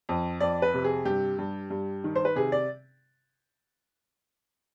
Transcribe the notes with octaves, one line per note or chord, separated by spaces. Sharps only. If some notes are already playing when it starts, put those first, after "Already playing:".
F2
F2 D5
B4
C3
G#4
G2 G4
G2
G2
D#3
C5
B4
C3 G#4
D5